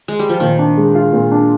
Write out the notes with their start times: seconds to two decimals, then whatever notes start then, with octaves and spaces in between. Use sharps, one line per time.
0.08 G#3
0.19 G3
0.29 F3
0.40 A#2 D#3
0.59 D4
0.77 G#3
0.95 F4
1.13 A#2
1.31 D4